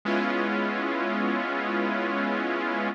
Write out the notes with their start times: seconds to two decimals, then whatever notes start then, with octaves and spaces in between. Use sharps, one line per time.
0.05 G#3 B3 C#4 E4 F4